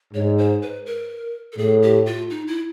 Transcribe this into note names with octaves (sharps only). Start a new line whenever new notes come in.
G#2 C#5
C5
B4
A#4
A4
A2 G#4
G4
F4
D#4
E4